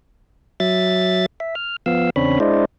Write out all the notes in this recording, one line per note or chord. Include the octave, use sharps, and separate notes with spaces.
F#3 E5 A6
E5
F6
F3 B3 F5 E6
E2 C#3 C4 D4 C#5 B5
G#3 D4 E4 C5 D5 D#5